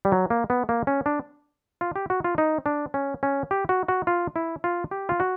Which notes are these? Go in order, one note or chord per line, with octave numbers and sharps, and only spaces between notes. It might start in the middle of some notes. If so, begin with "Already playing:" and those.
G3
F#3
A#3
B3
A#3
C#4
D4
F4
G4
F#4
F4
D#4
D4
C#4
C#4
G4
F#4
F#4
F4
E4
F4
G4
F4
F#4